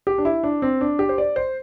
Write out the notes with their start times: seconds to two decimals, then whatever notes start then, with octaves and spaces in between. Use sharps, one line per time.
0.07 G4
0.18 D4
0.25 E4
0.43 D4
0.62 C4
0.81 D4
0.99 G4
1.09 C5
1.18 D5
1.36 C5